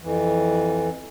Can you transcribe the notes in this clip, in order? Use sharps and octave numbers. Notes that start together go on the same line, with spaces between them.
F2 E3